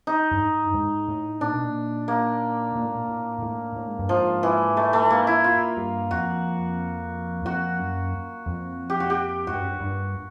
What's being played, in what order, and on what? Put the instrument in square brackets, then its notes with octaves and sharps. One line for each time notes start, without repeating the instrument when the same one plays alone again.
[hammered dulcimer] D#4
[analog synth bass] G2
G#2
G2
G#2
A2
[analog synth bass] A#2 [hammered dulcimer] D4
[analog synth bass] B2
A#2
[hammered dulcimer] A#3
[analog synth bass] A#2
A2
A#2
A2
A2
A2
G#2
G2
[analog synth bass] G#2 [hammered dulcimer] F3
[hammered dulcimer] E3
A3
A3
A#3
E4
F4
[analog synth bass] G2
[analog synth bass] F2 [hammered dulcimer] F#4
[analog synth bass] F2 [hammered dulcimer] F#4
[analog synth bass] F#2
F2
[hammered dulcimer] G4
F#4
G4
[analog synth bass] G#2 [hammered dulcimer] F#4
[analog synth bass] G2
F#2
G2
G2